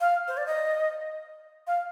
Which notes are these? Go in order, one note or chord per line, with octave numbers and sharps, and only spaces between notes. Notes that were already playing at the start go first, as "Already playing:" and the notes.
F5
C5
D5
D#5
F5